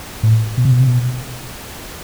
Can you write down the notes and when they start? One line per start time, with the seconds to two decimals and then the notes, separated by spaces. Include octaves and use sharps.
0.23 A2
0.57 B2
0.65 C3
0.72 B2
0.80 C3
0.87 B2